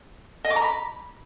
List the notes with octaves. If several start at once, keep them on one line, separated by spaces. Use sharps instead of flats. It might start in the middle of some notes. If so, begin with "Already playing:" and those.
D#5
D6
A#5
B5